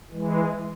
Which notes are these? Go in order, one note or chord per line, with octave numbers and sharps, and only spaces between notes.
E3 G#3